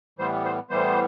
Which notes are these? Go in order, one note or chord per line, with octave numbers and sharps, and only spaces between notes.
A2 E3 G3 B3 C5
C5
A2 E3 G3 B3 C5